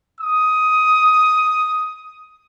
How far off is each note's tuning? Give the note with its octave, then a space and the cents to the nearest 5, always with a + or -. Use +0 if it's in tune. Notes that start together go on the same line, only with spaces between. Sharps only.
D#6 +10